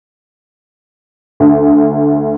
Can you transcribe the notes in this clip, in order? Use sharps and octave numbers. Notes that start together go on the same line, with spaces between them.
D2